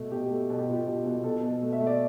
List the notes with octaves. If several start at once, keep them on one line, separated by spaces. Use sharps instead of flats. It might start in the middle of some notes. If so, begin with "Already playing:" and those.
Already playing: B2 A3
B2 G4
A3
B2 A4
G4
B2 F4
G4
B2
B2
B2 A4
B2
A3
E5
A3
D5